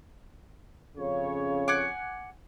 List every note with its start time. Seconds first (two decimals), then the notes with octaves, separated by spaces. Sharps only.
0.98 F2 C#3 C#5
1.68 F#5 G#5 D6